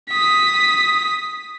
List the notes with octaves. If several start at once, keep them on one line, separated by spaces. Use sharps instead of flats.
D#6 B6